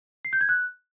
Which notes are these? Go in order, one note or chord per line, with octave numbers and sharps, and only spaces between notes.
C7
G6
G#6
F#6